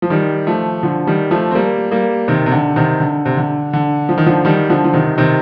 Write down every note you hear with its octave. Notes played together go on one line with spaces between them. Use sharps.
F3
D#3 G3
F3 A3
D3 F3
D#3 G3
F3 A3
C4
G3 A#3
G3 A#3
C3 D#3
C3
D3
C3 D#3
D3
C3
D3
D3
F3
D#3
D3 F3
D#3 G3
D3 F3
F3
C3 D#3
C3 D#3